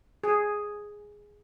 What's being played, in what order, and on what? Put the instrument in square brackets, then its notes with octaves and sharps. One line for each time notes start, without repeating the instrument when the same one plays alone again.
[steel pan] G#4